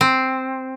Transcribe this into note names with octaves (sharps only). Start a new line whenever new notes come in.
C4